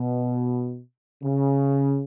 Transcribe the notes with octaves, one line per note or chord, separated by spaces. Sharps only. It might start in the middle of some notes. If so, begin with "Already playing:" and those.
Already playing: B2
C#3